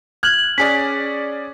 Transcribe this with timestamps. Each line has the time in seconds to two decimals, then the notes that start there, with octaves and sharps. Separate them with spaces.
0.23 F6 F#6 G#6 F#7
0.58 C#4 G#4 D5 B6